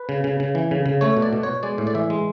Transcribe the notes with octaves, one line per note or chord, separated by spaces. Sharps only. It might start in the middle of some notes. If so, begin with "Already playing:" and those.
Already playing: B4
C#3
C#3
C#3
E3
C#3
C#3
A3 C#5
B2
D5
B2
B2 C#5
G#3 D5
A2
D5
E3 E5
G#3